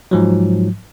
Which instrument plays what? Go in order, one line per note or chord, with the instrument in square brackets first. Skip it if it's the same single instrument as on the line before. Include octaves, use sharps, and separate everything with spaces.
[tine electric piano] G#2 F3 F#3